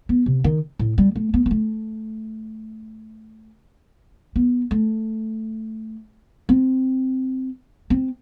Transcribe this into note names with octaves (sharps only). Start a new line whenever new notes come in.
B3
C3
D#3
A2
G3
A3
B3
B3
A3
B3
A3
C4
C4